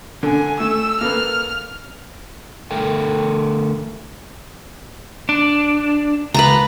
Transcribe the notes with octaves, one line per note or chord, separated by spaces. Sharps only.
D3 G#5
A3 E6
A#3 A4 B4 F6
D3 A3 A4 A#4 G5
D4
C#2 B4 A5 A#5